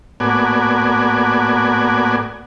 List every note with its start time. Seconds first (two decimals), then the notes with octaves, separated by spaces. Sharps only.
0.20 A2 A#3 B3 F#4 D5 G#5